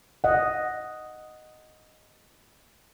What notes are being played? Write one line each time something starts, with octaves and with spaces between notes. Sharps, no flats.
D#5 F#5